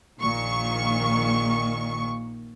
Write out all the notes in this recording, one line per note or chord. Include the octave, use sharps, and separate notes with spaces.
A#1 A#2 D#3 C#6